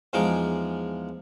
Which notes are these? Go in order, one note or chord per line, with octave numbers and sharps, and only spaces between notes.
E2 F3 G#3 D#4 D6